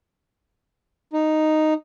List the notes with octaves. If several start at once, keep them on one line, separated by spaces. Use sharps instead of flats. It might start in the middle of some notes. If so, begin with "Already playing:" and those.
D#4